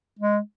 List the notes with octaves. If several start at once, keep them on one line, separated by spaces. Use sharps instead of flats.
G#3